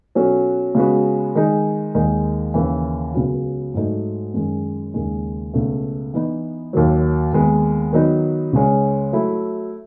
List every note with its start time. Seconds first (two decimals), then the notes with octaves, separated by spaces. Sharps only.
0.15 B2 F#3 C#4 F#4 A4
0.75 C#3 G#3 B3 F#4
1.35 D#3 G#3 D#4 G#4
1.95 D#2 D#3 G#3 D#4
2.54 D#2 C#3 E3
3.14 C#2 C#3 F#3 B3
3.74 G#2 F#3 A3 D#4
4.34 F#2 D#3 G#3
4.94 D#2 C#3 G#3 D#4
5.54 C#2 B2 A3
6.14 E3 B3 D#4
6.73 D#2 D#3 F#3
7.33 D#2 D#3 G#3 B3
7.93 D#3 F#3 B3 D#4
8.53 C#2 C#3 G#3 C#4
9.13 F#3 A3 E4